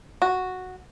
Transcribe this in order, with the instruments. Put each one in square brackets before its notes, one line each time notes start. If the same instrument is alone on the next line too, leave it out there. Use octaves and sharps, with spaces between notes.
[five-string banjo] F#4